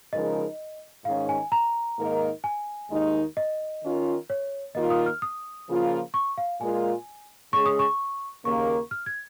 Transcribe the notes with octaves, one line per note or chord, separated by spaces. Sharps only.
C#3 F3 G#3 D#4 A#4 D#5
G#2 D#3 C#4 F5
G#5
A#5
G#2 D#3 A#3 D#4 A#4
G#5
D#2 D#3 G#3 D#4
D#5
D#3 C#4 F4 A#4
C#5
D#2 D#3 A#3 F4 D#5
D#6
F6
D#6
C#3 F3 A#3 F4
C#6
F5
A#2 G#3 F4 A#4 G#5
C#3 G#3 C#4 G#4 C#6
D#6
C#6
D#2 C#3 A#3 C#6
F6
G#6